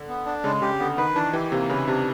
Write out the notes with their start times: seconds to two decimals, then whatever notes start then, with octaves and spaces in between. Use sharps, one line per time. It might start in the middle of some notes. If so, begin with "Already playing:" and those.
Already playing: D3
0.08 B3
0.26 D4
0.44 C#3 G#3
0.62 C#3 G4
0.80 D3 B3
0.98 D#3 B4
1.15 E3 D4
1.33 E3 G4
1.52 C3 A#3
1.69 C#3 B4
1.88 C3 D4